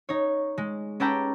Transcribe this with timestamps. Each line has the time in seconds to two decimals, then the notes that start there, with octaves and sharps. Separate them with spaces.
0.09 D#4 C#5
0.58 G#3
1.00 C#4 G4 A4 B4 G5 A#5